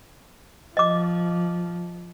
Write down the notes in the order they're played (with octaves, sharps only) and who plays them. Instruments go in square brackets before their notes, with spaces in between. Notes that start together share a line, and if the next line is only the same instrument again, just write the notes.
[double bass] F3 [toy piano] D#5 D6